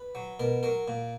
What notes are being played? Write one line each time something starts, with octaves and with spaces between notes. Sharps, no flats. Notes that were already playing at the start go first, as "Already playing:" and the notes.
Already playing: B4
F#3
B2 A#4
F#3 A#4
A#2